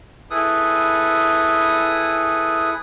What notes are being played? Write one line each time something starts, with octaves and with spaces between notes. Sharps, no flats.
E4 G#4 A4 B4 D#6